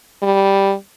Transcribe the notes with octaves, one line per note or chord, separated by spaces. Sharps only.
G3